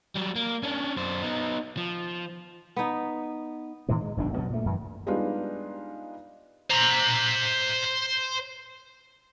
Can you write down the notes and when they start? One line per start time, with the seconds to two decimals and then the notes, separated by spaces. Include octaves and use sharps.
0.15 F#3 G3
0.36 A#3
0.63 C#4 D4
0.97 F#2 C5
1.22 B3 D#4
1.77 F3
2.76 B3 D#4
3.89 A2 D#3 E3 G#3
4.01 G#3
4.17 F1 B1 G2 D4
4.34 B2 F#3 B3
4.50 A#2 A3
4.66 F#2 E3
5.07 G3 G#3 B3 D4 D#4 F4
6.70 C5 A#5